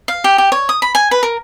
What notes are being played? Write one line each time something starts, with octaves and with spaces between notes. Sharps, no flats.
F5
G4
G4
C#5
D#6
B5
G#5
B4
A#4